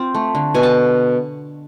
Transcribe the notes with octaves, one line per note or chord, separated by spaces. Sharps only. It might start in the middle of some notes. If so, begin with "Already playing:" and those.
Already playing: C4 F4
A3
D3
B2 G#5
A5